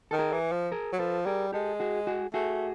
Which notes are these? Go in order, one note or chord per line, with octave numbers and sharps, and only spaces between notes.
D#3 A4
G#4 A#4
E3
F3
G#4 A#4
F#3
F3 A4 B4
G3 G#4 A#4
G#3 G4 A4
F#4 G#4
F#4 G#4
A3 F#4 G#4